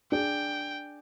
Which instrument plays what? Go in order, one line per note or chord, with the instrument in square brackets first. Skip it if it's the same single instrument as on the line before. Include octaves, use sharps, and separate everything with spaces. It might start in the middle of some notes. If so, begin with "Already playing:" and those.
[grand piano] D4 G#4 [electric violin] G5